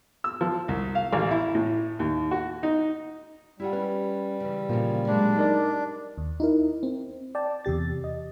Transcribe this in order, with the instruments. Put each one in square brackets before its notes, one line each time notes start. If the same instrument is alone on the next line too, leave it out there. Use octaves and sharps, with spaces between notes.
[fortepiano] E6
F3
C2
F5
A1
E4
A2
D#2
F#4
D#4
[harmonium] G3 [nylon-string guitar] E4 F4 F#5
[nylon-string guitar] C#4 [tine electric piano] B4
[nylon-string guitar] C#3 E3
[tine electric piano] A#2 A#3 [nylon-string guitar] C#3 E3 F3
[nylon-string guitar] F#3 G#3 [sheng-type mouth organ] D4
[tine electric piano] D#4 A#4 D5
[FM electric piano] D#2
D#4 E4 A#4
C4
D5 G5 A5
E2 C3 G4 A6
D#5